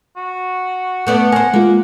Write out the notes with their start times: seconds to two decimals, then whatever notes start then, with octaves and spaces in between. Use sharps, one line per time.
0.17 F#4
1.07 A3 B3 D5 F#5
1.32 A#4 C5 G#5
1.54 G#3 A#3 F4